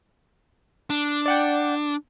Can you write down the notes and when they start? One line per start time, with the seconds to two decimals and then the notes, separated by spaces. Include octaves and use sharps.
0.90 D4
1.26 D5 F#5 G5